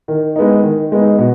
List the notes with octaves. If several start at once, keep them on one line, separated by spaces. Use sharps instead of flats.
D#3
G#3 B3 D#4
D#3
G#3 B3 D#4
B2